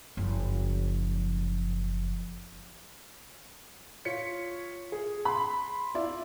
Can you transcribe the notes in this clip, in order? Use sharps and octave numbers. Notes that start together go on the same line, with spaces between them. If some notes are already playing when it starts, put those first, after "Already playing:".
F#1 F3
F4 C#5 B6 C#7
G#4
B5 C6
E4 F4 D5